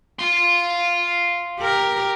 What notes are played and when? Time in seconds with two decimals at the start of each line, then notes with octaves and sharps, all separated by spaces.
0.19 F5 C6
1.60 G4 A#4